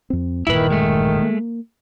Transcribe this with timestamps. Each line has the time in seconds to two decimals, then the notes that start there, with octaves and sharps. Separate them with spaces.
0.10 F2 C4
0.47 E1 G2 A#2 D#3 E4 B4
0.70 G#3 A3
1.22 A#3